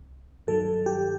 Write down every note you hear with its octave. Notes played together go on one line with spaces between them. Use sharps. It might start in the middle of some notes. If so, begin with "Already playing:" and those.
Already playing: C2
G2 D#3 F#3 A4
G4